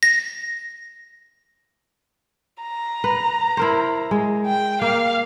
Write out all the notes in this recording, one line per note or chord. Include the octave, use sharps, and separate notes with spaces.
A#6
A#5
B4
E4 A#4 C5
G#3
G5
A#3 F5